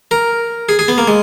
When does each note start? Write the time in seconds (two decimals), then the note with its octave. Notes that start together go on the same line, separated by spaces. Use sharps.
0.11 A#4
0.69 G#4
0.79 G#4
0.88 B3
0.98 A#3
1.08 G#3